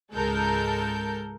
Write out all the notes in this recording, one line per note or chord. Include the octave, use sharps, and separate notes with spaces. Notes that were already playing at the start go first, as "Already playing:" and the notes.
C#2 G#2 G#3 A4 A#4 G6